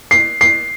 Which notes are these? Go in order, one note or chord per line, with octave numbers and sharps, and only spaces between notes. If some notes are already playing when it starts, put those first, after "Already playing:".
C7
C7